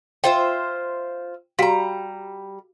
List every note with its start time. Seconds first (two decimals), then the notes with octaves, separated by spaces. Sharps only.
0.24 F4 C5 E5 G5
1.59 G3 F#4 G4 F5 A#5